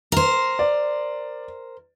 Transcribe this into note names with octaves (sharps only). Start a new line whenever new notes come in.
A#4 C5
D5